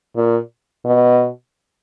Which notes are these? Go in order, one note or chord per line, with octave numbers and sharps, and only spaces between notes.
A#2
B2